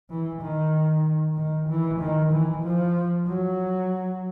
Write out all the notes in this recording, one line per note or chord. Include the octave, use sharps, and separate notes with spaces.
E3
D#3
D#3
E3
D#3
E3
F3
F#3